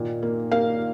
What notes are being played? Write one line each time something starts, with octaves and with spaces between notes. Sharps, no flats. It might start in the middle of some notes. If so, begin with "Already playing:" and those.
Already playing: A#2 D#3
A#3
A#3 F5